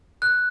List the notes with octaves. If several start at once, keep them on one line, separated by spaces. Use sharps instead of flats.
F#6